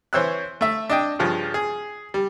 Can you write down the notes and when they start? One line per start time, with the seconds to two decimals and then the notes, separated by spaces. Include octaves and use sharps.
0.13 E3 C5 C#5 E6 F#6
0.61 A3 E5
0.89 D4 D#5 G5
1.19 G2 C#3 F3
1.54 G#4
2.14 G3